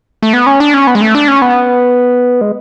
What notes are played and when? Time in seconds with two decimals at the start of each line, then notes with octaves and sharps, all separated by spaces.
0.22 A3
0.33 B3
0.46 C#4
0.60 D4
0.74 C#4
0.87 B3
0.95 G#3
1.02 A3
1.15 D4
1.28 C#4
1.42 B3
2.41 G#3